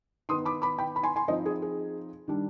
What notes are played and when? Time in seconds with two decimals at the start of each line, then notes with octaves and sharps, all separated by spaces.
0.29 D#3 B3 D#4 C6 D#6
0.45 B5 D6
0.62 B5 D6
0.78 G5 B5
0.96 B5
1.03 G#5 C6
1.16 G#5 C6
1.28 F3 C4 D#4 C5 D#5
1.46 G#4
1.62 G#4
2.28 D#3 G3 D4